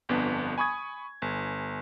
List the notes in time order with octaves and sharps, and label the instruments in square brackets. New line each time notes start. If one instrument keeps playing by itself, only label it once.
[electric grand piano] G1 F2 B3 D4
G#5 B5 C#6 D#6 G#6
G1